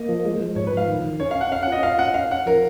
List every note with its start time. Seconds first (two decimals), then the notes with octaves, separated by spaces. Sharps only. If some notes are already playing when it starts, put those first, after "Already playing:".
Already playing: A#3 D#5
0.09 F3
0.25 G#3
0.40 F3
0.56 G#2 C#5
0.67 B4
0.73 F3 F5
0.88 D#3
1.04 D#3
1.20 C#4 C#5
1.31 F5
1.36 C#4
1.41 F#5
1.52 C#4 F5
1.63 F#5
1.68 F4 D#5
1.83 F4 F5
1.99 C#4 F#5
2.14 C#4 F5
2.30 C#4 F#5
2.46 F3 A#4